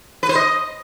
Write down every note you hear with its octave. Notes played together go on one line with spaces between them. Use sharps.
B4
C5
D#5